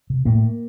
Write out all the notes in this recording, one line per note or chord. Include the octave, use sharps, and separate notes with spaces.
C3
A2 A#3